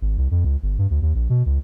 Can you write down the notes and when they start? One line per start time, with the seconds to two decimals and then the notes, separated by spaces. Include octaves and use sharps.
0.02 G#1
0.18 C2
0.31 F2
0.44 C#2
0.63 G1
0.78 G2
0.90 D2
1.02 D#2
1.15 A#1
1.30 B2
1.46 C#2